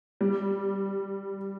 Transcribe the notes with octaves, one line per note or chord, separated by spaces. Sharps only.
G3